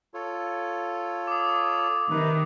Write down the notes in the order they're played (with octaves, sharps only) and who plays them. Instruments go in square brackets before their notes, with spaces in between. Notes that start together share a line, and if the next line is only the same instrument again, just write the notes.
[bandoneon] F4 A4 C#5
[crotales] D6 D#6
[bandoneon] C3 D#4 B4 [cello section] D#3